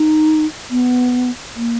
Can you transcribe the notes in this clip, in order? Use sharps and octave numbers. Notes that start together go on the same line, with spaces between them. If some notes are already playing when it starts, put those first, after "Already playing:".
Already playing: D#4
B3
A#3